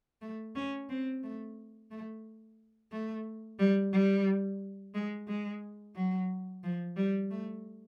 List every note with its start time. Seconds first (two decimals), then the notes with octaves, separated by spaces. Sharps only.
0.22 A3
0.55 C#4
0.89 C4
1.23 A3
1.91 A3
2.92 A3
3.59 G3
3.93 G3
4.94 G#3
5.28 G#3
5.95 F#3
6.63 F3
6.97 G3
7.31 A3